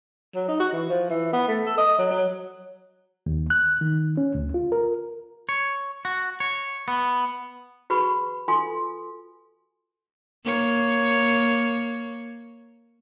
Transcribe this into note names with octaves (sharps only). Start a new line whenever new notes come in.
F#3
D#4
F#4
E3
F3
E3
B3
A3
A4
D#5
F#3
F#3
D#2
F#6
D#3
C#4
D2
F4
A#4
C#5
F#4
C#5
B3
F#4 G#4 B4 B5 C#6
F4 A4 G#5 C6
A#3 C#5